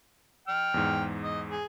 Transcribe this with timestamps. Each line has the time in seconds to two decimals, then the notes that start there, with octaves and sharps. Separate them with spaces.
0.48 G5 F6
0.74 E2 G#2
1.23 D#5
1.51 G#4